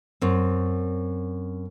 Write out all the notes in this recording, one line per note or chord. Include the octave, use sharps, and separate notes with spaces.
F#2 C4